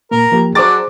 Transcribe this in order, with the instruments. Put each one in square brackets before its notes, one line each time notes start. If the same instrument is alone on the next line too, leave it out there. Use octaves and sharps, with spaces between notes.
[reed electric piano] A#2 A#3 [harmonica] A#4
[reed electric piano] F3 A#3 G4
[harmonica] F#3 D4 [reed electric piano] G#4 C5 [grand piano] D6 A6